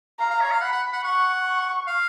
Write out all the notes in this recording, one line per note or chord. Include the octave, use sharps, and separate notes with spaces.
F5 A#5
F5
C#5
F5
F#5 B5
F#5
F#5
F#5 C#6
C#6
F5